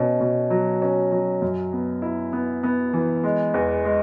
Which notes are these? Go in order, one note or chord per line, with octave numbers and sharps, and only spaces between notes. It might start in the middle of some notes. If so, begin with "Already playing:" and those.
Already playing: B2 C#4
B2
F#3
C#4
F#3
F#2
B3
E4
B3
B3
E3
G#3
E2
G#3